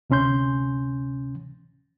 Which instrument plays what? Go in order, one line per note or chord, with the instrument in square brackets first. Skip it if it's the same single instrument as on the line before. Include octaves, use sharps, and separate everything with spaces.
[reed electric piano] D2 C3 C#4 C6 G6